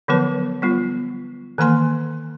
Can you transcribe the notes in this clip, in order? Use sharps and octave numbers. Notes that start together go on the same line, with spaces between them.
D3 F3 F#3 B3 B4 A5
G3 B3 F4
D#3 E3 A#3 G#5 C6